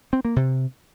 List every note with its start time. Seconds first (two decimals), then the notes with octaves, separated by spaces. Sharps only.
0.13 C4
0.25 A#3
0.36 C3